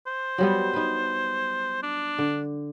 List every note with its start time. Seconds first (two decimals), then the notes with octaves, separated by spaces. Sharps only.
0.07 C5
0.38 F#3 G3 B3
0.74 D#4 B4
1.83 D4
2.18 D3